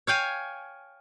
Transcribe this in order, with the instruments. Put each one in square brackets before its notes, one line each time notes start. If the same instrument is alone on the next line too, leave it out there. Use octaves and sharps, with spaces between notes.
[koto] C#5 F5 G5 G#5